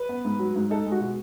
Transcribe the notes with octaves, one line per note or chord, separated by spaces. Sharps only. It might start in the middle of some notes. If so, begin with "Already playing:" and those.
Already playing: B4
B3
G#2
F#3
G#2
D#4 A4
G#3
F#4
B2